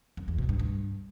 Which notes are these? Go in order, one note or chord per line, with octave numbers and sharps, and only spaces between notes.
F#2
E2
B2
G2
G2